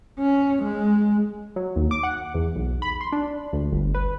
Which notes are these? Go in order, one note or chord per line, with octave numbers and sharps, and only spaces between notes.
C#4
G#3
F#3
D#2
D6
F#5
E2
B1
B5
C6
D4
D2
G1
B4